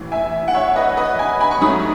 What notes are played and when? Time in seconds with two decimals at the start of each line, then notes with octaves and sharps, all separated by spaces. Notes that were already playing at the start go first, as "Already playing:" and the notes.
Already playing: A1 A2 E3
0.12 E5 G#5
0.48 F#5
0.54 C#5 E5
0.76 B4 D#5
0.97 B4 D#5
1.19 G#5 B5
1.41 G#5 B5
1.51 C#6
1.61 G#2 F#3 A3 C#4 B5 D#6